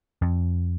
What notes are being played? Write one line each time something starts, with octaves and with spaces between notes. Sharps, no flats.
F2